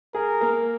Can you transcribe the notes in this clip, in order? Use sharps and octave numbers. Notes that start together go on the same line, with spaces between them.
G#4 A#4
A#3